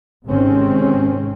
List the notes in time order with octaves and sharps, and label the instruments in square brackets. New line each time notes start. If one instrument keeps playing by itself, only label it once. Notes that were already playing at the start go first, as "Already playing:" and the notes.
[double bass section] G#1 C3 D#3 G#3 C4 C#4